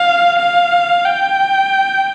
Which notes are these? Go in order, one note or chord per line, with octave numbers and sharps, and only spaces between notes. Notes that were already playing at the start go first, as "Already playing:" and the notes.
Already playing: F5
F5
G5